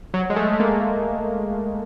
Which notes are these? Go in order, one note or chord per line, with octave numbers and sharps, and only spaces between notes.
F#3
G#3
A3
A3
A#3